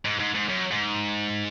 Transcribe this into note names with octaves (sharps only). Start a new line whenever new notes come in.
G#2
G#2
G#2
F#2
G#2